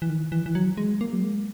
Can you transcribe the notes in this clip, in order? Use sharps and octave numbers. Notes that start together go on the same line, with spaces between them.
E3
D#3
E3
E3
F#3
G#3
A#3
F#3
G#3